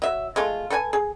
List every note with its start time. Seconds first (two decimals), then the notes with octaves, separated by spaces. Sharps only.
0.02 F#3 E5
0.36 G#3 A3 F4
0.70 A4 B4 F#5 G#5
0.93 G#4